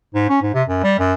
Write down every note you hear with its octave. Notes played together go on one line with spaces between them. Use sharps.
G#2
C#4
G#2
C3
F#2
G3
F#2